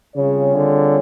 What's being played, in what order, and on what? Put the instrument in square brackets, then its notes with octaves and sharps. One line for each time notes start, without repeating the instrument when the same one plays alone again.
[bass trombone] C#3 [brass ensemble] G3 C4 F4 G#4 C#5
[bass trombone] D3